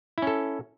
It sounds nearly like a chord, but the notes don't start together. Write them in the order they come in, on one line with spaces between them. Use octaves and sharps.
E4 C#4 A4